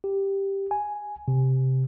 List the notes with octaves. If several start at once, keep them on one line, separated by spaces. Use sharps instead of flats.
G4
G#5
C3